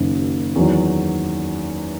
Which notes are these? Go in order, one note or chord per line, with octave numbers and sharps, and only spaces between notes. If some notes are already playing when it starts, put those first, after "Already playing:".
Already playing: F#1 F#2 D#3
E2 D#3 F#3